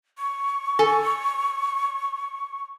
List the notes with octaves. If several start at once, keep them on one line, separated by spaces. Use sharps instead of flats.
C#6
A4 G#5